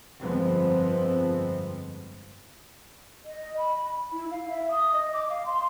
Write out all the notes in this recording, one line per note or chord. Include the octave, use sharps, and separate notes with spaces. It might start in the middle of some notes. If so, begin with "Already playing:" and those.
G1 F2 F3 G#3 B3 C4
D#5
B5
E4
F5
E5
D#6
D#5
D6
F5
C6